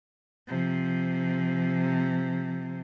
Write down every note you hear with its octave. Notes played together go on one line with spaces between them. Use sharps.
C3 F3